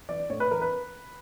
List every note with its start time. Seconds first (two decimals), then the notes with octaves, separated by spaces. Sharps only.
0.09 E3 D5
0.30 A2 C#5
0.40 B4
0.51 E3 A#4
0.62 B4